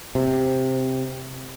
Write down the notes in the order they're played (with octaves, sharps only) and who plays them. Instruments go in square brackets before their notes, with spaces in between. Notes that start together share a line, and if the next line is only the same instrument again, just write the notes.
[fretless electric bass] C3